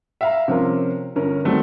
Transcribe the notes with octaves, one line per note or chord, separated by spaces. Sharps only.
E5 F5 A#5
C3 F3 C#4 F4 A#4
G1 C#4 A#4
D#3 F#3 G3 A3 C4